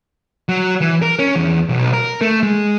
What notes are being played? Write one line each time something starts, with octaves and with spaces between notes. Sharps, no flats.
F#3
E3
A#4
C#4
E2
B1
A#4
A3
G#3